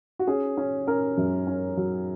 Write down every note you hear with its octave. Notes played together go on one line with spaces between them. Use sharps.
F#4
C#4 G#4
C#4
C#4 A#4
F#2
C#4
F#3